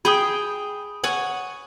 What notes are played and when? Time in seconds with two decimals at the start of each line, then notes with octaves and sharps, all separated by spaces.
0.05 G#4 G5 B5 D#6
1.04 C#5 F#5 G#5